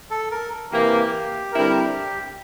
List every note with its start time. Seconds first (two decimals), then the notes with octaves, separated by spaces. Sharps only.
0.11 A4
0.31 A#4
0.71 C3 E3 A#3 G4
1.53 D3 G3 C4 E4 A#4